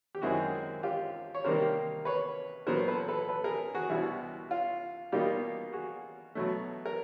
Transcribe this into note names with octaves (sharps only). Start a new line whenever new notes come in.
G4
F#2 D#3 G#3 C4 E4 F#4 G#4
F4 G4
C#5
C3 D#3 G3 A#3 A#4 C5
B4 C#5
A#2 F#3 B3 A#4 C5
C5
A4 B4
A4 B4
A4 B4
G#4 A#4
F#4 G#4
C2 B2 G3 E4 F#4
F4
B2 G3 A#3 D#4 F4 G4
F#4 G#4
B2 F#3 A3
A#4